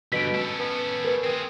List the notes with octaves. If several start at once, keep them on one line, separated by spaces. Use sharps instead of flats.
G2 B2 D3 B6 D7
C#4 A4
B3
A#4 B4
C4 G#4